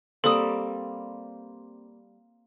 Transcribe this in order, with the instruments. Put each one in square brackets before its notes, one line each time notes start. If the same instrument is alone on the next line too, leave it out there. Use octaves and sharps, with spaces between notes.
[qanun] G3 A#3 C4 [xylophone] A4 D#6